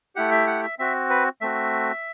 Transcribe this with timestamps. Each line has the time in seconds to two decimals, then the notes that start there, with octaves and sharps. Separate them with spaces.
0.16 A3 E4 G4 F#5
0.31 E5
0.47 F#5
0.63 E5
0.79 C4 F#4 E5
1.10 B4
1.41 A3 C4 F#4 E5